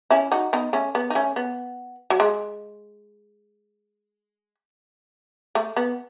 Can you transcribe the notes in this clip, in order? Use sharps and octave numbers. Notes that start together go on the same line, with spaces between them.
C#4 E4
D#4 F#4
B3 D#4
A3 C#4
B3
D#4
A3 C#4
B3
F#3
G#3
A3
B3